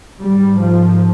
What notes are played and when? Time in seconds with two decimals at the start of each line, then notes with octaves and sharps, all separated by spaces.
0.21 G#2 G3
0.60 F3